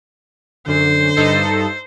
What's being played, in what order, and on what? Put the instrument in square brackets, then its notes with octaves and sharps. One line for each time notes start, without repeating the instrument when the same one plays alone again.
[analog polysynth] F#2 [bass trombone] D3 [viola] C5
[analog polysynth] G2 D#4 A4